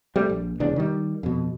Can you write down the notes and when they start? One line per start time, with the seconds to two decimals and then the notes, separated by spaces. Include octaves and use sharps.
0.16 G3 A3 C4
0.29 A#1
0.60 F1 E2 C#3 D4
0.76 D#3 G3
1.23 F2 B2